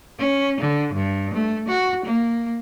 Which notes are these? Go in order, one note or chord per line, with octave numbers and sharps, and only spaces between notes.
C#4
D3
G2
A3
F#4
A#3